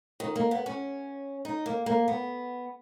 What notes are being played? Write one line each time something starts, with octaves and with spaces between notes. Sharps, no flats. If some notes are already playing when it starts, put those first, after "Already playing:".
D#3
A#3
B3
C#4
D#4
A#3
A#3
B3